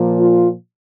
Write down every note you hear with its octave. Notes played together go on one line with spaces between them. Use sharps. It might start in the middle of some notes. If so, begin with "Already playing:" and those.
Already playing: A#2 F3
F4